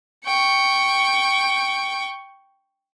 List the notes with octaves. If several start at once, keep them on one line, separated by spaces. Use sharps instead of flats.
G5 C#6